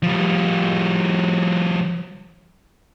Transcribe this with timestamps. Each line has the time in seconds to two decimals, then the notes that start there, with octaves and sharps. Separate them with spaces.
0.03 F3 G3